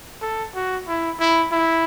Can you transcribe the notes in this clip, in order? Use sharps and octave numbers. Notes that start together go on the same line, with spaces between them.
A4
F#4
E4
E4
E4